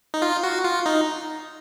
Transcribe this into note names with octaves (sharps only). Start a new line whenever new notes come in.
D#4
F4
F#4
F4
D#4